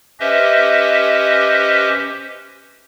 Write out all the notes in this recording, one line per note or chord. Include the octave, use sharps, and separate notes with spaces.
C#4 G4 B4 C5 D#5 E5